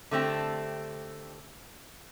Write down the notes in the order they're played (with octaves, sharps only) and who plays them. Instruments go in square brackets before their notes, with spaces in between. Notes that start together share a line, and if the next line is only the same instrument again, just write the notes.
[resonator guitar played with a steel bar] D3 A3 C4 G4